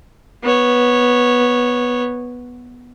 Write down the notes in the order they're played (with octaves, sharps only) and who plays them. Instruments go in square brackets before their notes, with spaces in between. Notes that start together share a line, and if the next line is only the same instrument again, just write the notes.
[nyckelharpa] B3 C#5